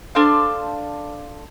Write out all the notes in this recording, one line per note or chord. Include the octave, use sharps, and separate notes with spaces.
D4 A4 C5 F5